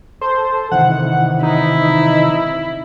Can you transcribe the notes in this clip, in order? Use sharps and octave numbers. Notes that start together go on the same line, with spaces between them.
A4 C5
C3 D#3 E3 F#5
D#4 E4